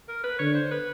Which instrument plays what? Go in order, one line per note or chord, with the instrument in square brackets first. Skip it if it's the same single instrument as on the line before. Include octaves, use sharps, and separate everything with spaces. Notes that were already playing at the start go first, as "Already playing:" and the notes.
[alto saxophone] A#4
B4
[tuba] D3 [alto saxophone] C#5
[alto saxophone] C5
B4